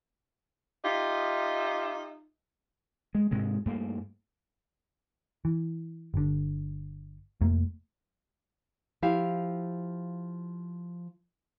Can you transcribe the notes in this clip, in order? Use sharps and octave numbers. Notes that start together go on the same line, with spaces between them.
D#4 F4 G4 D#5 E5
G#3
G#2 C3 G#3
G2 A3 A#3
E3
G1 D3
F1 F2 A3 A#3
F3 E4 G4 F5